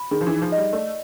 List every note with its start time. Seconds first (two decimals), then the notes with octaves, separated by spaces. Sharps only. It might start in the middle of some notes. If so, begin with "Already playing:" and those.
Already playing: B5
0.11 D#3 G#4
0.21 F3
0.27 E3 D#4
0.42 F3
0.52 G3 D#5
0.73 A3 D5